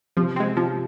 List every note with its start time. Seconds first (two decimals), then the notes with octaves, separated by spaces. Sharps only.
0.17 C3 F3
0.36 G#3 C4
0.56 C3 F3